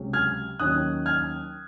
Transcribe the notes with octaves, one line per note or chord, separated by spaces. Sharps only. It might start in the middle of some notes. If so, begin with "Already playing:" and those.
Already playing: C#2 C3 F#3 C#4
F6 G#6
D#2 D#3 F#3 C#4 D#6 F#6
F6 G#6